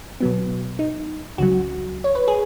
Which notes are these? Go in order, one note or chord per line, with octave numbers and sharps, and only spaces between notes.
B2 F#3 B3
D#4
C#2 C#3 F#3 F#4
C#5
B4
G#4